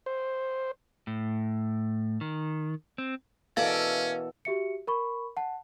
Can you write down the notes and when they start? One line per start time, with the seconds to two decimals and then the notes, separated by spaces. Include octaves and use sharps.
0.06 C5
1.07 A2
2.21 D#3
2.98 C4
3.57 B2 E3 C#4 A4 A#4 D5 F5
4.45 F#4 G4 E5 C#7
4.87 A#4 B5 C#6
5.37 F#5 A5